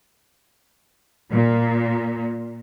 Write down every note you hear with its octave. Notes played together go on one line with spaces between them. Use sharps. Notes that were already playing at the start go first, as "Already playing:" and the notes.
A#2